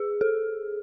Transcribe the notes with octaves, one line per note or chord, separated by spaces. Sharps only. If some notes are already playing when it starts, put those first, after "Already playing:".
Already playing: G#4
A4